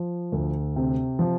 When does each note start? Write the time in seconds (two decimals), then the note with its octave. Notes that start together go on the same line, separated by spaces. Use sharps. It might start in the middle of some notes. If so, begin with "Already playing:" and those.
Already playing: F3
0.32 D2
0.76 C3
1.19 F3